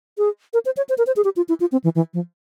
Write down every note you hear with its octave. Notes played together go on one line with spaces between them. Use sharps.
G#4
A#4
C5
C#5
C5
A#4
C5
G#4
G4
F4
E4
F4
C4
E3
E3
F3